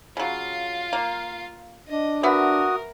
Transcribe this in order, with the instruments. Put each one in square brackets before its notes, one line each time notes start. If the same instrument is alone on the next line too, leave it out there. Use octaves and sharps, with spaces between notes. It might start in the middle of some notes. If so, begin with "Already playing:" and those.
[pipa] C#3 F#3 [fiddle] F4 F5
[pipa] A#3
[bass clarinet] D4 [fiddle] D#5
[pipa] B3 E5 [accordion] F#4 D#6 [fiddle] A#4